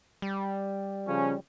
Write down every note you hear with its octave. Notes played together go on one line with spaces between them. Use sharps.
G3
C#3 F3 C#4